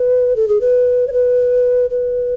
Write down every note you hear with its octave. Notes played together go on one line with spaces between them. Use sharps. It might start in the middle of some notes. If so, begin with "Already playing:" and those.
Already playing: B4
A4
G#4
B4
C#5
B4
B4